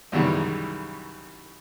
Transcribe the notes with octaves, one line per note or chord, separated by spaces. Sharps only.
C2 F#2 D#3 E3 G3 G#3